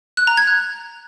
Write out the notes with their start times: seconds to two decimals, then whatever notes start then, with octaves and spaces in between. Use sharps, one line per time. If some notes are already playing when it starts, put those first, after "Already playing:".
0.17 F#6
0.27 A#5
0.37 G#6
0.47 F#6